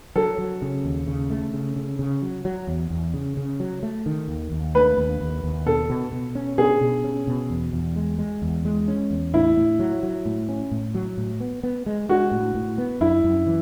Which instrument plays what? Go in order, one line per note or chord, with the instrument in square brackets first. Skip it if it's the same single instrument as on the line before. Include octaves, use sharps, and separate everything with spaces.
[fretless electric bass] F#3 [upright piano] A4
[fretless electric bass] F#3
C#3
D#2
C#3
A3
C#3
C#3
C#3
F#3
F#3
E2
E2
C#3
C#3
F#3
A3
D#3
D#2
D#2
[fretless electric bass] A3 [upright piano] B4
[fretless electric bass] D#2
D#2
D#2
[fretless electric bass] B2 [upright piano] A4
[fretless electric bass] B2
B2
C#4
[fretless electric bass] B2 [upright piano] G#4
[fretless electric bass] B2
C#4
B2
E2
E2
G#3
G#3
E2
G#3
C#4
E2
[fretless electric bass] A2 [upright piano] E4
[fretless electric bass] A2
F#3
F#3
A2
C#4
A2
F#3
A2
B3
B3
G#3
[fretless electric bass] G#3 [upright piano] F#4
[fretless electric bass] A2
A2
B3
[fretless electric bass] F#2 [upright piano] E4
[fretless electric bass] F#2
E3